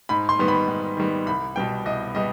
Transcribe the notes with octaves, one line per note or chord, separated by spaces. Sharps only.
G#2 B5
C6
D#3 G3 B3
B5
G#2
D#3 G3 B3
C2 B5
B2 G3 B3 G5
C2 D#5
B2 G3 B3 D#5